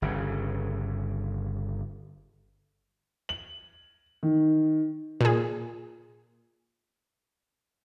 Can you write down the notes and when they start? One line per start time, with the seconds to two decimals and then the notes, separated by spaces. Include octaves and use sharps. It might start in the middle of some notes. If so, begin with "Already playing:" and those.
0.02 G1 C#3
3.29 F#7
4.23 D#3
5.21 A#2 G#4